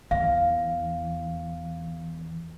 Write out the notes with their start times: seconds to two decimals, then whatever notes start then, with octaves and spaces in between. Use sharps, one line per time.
0.11 E2 F5